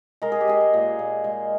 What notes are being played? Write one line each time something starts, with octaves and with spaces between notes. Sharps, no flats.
G#3 A#4
G#4
G4
G#3 G#4
G#4
A#2
A#2
G#3